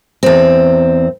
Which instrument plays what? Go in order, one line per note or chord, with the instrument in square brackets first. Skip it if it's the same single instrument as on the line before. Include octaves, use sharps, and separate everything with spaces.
[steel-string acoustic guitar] E2 C4